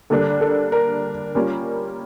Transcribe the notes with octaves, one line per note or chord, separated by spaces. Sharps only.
D3 G3 A#3 D4 A4
A4
A#4
G3 A#3 C#4 F4